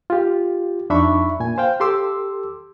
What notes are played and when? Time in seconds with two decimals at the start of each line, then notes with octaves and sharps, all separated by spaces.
0.10 F4 G4
0.90 F2 D4 D#4 E5 B5 C#6
1.40 A#2 G#5
1.58 C5 F5 G5
1.80 G4 A4 C6 D6 E6